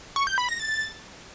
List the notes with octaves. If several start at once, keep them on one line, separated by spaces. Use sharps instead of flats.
C#6
G6
B5
A#6
A6